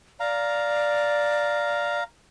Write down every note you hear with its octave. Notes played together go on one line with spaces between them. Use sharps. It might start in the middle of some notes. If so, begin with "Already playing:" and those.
D5 F5 A#5